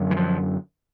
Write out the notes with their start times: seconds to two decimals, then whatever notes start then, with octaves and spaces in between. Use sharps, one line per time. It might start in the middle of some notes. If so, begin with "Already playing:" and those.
Already playing: F#2 D3
0.11 E3
0.17 F3